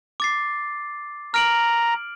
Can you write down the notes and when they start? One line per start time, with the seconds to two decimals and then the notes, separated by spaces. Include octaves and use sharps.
0.20 D6 A6 C7
1.34 A#5 F6 D7 F#7